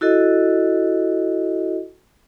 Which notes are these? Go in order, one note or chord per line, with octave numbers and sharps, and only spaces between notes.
E4 F#4 A4 D#5